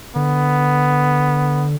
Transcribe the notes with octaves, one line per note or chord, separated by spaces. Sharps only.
D3 B3